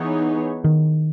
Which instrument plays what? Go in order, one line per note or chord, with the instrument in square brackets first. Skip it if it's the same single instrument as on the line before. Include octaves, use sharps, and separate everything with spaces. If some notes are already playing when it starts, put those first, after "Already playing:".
Already playing: [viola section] E3 B3 D#4 G#4 C#5
[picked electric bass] D#3